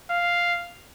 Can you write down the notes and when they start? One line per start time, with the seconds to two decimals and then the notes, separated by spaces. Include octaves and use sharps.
0.10 F5